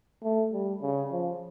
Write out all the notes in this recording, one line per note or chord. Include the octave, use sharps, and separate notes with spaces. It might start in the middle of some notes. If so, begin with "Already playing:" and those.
A3
G3
C#3
F3